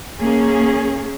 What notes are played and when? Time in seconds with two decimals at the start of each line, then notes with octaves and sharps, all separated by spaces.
0.20 A#3 C#4 G#4